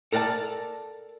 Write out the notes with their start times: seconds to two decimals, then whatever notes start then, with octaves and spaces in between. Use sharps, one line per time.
0.12 A4 A#4 D5 F5 A5